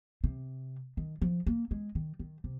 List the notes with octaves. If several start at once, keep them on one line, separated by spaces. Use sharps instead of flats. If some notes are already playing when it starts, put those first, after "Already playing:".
C3
D#3
F3
A#3
G#3
D#3
D#3
C3